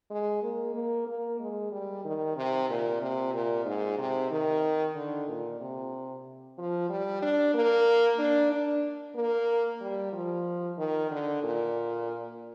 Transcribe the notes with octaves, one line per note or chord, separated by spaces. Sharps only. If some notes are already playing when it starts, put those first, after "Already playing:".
G#3
A#3
A#3
A#3
G#3
G3
D#3
C3
A#2
C3
A#2
G#2
C3
D#3
D3
A#2
C3
F3
G3
D4
A#3
D4
D4
A#3
G3
F3
D#3
D3
A#2